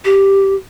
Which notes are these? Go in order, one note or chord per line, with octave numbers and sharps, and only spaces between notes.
G4